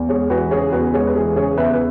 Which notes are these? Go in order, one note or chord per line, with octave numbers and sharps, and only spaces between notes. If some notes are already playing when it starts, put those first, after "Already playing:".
Already playing: E2
G#3 G#4 C#5
E3 F#4 B4
C#3 G#4 C#5
E2 F#4 B4
G#3 G#4 C#5
B4
E3 G#4
C#3 G#4 C#5
E2 B4 E5
B4